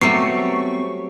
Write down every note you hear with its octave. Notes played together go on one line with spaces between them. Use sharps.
F#3 G3 A3 B3 C4 C#6 C7